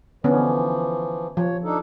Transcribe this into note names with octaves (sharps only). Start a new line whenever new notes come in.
D3 E3 F3 B3 C#4
F3 C#5
D4 D#4 A4